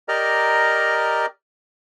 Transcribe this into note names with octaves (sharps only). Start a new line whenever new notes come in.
G4 A#4 D5 D#5 A#5 F6